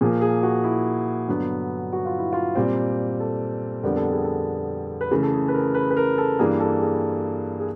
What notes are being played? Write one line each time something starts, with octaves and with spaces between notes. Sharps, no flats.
A#2 F3 A#3 G#4
G#4
F#4
E4
G2 D3 F#3 B3
F#4
F4
E4
F4
A#2 G3 C4
A4
F2 D3 G3 B3 A#4
A4
G#4
A4
B4
C#3 E3 A3 A#4
A4
G#4
B4
A#4
B4
B4
A#4
A4
G2 E3 G3 A#3 G#4
A4
G#4
G#4